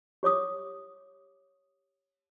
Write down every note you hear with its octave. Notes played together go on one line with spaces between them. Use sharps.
G4 C#5 D6 D#6